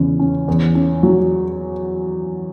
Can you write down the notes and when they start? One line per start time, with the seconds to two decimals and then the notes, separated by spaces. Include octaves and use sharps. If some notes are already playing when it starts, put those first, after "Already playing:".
Already playing: E2 C#3
0.20 C#4
0.48 E2
0.75 C#4
1.03 F#3